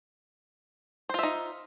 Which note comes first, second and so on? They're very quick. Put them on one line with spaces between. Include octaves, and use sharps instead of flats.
C5 F4 E5 D#4